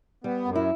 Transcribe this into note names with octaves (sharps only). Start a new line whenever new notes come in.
G3 B3
F#2
E4